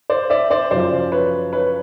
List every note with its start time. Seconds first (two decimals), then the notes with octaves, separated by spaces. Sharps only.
0.10 C5 D5
0.30 D5 E5
0.50 C5 D5
0.71 F#2 C#3 F3 C5 D5
1.12 B4 C#5
1.53 B4 C#5